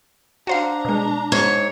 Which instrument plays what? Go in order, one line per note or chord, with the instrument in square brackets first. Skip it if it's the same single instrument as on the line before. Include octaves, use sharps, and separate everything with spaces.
[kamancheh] D4 A#5 [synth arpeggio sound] F#4 C5 F5
[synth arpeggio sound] B2 G#3
[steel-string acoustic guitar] G#2 C#5